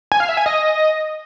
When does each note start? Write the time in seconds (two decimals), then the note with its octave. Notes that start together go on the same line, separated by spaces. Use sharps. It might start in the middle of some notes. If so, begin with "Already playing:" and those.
0.12 G#5
0.20 F5
0.29 E5
0.37 G#5
0.46 D#5